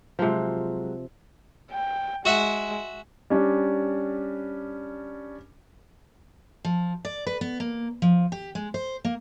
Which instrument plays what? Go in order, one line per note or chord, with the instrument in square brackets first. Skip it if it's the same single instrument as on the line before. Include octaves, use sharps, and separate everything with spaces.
[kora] C3 F3 [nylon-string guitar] F#3 G#3
[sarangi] G5
[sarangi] G#3 [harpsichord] F#4 E5 F#5
[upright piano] G3 C#4 D4
[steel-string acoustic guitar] F3
D5
B4
B3
A#3
F3
G4
G#3
C5
A#3